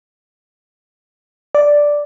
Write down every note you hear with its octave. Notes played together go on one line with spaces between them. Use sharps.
D5